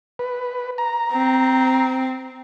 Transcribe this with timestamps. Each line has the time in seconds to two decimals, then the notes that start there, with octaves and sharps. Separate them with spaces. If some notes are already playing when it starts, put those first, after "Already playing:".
0.19 B4
0.78 A#5
1.12 C4